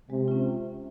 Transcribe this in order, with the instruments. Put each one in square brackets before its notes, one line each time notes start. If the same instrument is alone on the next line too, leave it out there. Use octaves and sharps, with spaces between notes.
[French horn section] C3 [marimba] G#3
[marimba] C#4 F4